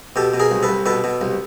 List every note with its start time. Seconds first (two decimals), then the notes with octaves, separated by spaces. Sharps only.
0.16 B2 G4 A4
0.34 B2
0.40 G#4 A#4
0.51 C2
0.63 A4 B4
0.69 C2
0.86 B2 A4 B4
1.04 B2
1.21 C2